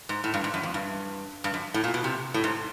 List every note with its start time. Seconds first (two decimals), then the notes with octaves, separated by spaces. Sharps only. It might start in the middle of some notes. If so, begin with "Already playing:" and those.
0.09 G#2
0.24 A2
0.34 G2
0.44 G#2
0.54 F#2
0.63 F2
0.74 G2
1.44 G2
1.54 F#2
1.74 A2
1.84 A#2
1.94 B2
2.04 C3
2.34 A2
2.44 G#2